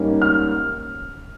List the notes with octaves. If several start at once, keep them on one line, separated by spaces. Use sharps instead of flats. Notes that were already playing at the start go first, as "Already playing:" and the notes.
Already playing: G#2 G3 A#3 C#4
F6